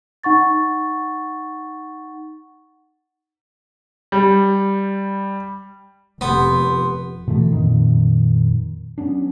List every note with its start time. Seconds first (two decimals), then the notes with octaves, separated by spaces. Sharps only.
0.23 D#4 F#5 C#6 A6
4.12 G3
6.21 F1 B3 G4 C6
7.27 B2 E3 F3 A3
7.52 F2 A#2 D#3
8.98 F#3 B3 C#4 D4